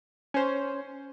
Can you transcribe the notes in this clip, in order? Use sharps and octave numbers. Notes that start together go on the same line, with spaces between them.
C#4 C5